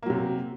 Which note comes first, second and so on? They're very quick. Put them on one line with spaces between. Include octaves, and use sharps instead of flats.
A#3 F#3 C3